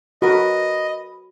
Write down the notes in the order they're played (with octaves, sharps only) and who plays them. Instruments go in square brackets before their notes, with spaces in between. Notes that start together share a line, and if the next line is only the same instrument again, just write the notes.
[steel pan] F#4 [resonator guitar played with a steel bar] A#4 B4 [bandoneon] D#5